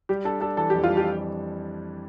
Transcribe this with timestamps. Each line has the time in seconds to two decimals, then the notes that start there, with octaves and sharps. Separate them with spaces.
0.09 G3 G4
0.25 D4 A4
0.41 D4 A4
0.57 E3 A4
0.70 F2 G4
0.84 F4
0.90 G3
0.97 G4